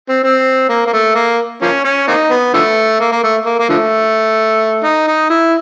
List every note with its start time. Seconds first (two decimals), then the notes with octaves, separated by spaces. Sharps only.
0.09 C4
0.24 C4
0.69 A#3
0.87 A#3
0.93 A3
1.15 A#3
1.62 F3 A#3 C#4
1.85 C#4
2.08 A#3 C4 D#4
2.31 B3
2.54 D3 F3 A3
3.00 A#3
3.12 A#3
3.24 A3
3.45 A#3
3.59 A#3
3.69 D3 F3 A3
4.84 D#4
5.07 D#4
5.30 E4